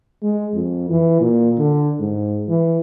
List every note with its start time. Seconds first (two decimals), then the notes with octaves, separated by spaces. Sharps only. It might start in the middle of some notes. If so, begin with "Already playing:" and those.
0.23 G#3
0.54 F2
0.89 E3
1.21 A#2
1.58 D3
1.99 G#2
2.48 E3